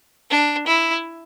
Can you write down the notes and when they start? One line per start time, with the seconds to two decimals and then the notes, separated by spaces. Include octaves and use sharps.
0.30 D4
0.67 E4